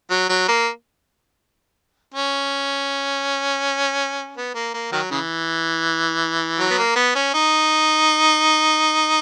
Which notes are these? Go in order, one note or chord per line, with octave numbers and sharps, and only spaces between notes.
F#3
F#3
A#3
C#4
B3
A#3
A#3
D#3 F#3
C#3 E3
F#3
B3
A#3
B3
C#4
D#4